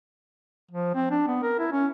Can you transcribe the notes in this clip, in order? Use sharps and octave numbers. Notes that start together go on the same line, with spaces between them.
F3
C4
D4
B3
A#4
E4
C#4